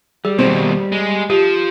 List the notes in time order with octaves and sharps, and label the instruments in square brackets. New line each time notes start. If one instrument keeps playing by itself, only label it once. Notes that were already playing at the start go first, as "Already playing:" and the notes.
[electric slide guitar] G3 [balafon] G#4
[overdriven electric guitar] D#2 B2 [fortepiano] C4
[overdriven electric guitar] G#3
[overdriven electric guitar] F3 [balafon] G4